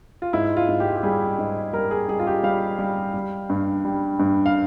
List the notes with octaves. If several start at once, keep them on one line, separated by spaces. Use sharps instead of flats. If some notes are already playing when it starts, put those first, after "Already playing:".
F4
G#2 E4
F4
G#2
G4
F4
G4
G3 G#4
G#2
G3 A#4
G#4
G3 G#4
F4
G4
G3 F5
G3
G3
G2
G3
G2
F5